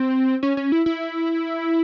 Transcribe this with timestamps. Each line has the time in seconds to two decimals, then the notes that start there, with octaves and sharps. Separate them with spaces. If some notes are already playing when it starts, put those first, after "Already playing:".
Already playing: C4
0.43 C#4
0.57 C#4
0.72 E4
0.86 E4